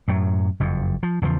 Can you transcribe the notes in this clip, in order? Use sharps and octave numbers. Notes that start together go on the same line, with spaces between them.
F#2 A2 F#3
F#1 F2
F3
E2 C#3 E3 F3